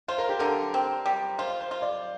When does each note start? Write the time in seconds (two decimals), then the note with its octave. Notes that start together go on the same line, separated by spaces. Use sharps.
0.08 F4 C5
0.18 A#4
0.29 G4
0.39 D3 A#4
0.74 C4
1.06 G3
1.38 F4 C5
1.60 C5
1.71 F4
1.82 D5